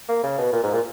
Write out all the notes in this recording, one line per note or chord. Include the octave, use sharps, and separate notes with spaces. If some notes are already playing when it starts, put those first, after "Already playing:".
A#3
C#3
B2
A#2
G#2
A#2